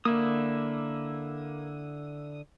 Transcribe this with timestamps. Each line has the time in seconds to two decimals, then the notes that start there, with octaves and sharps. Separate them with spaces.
0.05 D3 A#3 E4 D#6